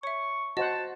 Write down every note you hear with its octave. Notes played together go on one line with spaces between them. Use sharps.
C#5 E5 C#6
F#4 C5 D#5 F#5 A5